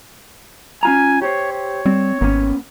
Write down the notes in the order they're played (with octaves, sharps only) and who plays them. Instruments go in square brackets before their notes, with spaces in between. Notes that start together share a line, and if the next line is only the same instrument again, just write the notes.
[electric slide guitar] C#4 F4 A#5 [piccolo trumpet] G#5
[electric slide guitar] G4 C5 [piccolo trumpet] C#5
[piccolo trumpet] C#5
[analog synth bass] G3 [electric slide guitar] C4
[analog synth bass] G#1 [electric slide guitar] A#3 B3 C#4